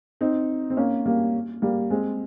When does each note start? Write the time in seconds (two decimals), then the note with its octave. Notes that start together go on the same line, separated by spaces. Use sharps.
0.21 C4 D#4
0.70 C4
0.77 A#3 C#4
1.06 G3 A#3
1.62 G3 A#3
1.90 G#3 C4